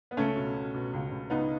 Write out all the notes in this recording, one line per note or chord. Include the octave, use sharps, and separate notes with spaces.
B3
C#2 A3 C#4
B2
B2
B2
C#2
C#2
C#2 B3 D#4